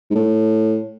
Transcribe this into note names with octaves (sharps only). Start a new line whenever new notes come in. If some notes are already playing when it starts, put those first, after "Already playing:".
G#2
A2